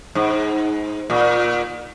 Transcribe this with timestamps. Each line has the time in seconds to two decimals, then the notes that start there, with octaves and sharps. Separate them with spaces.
0.15 G#2
1.10 A#2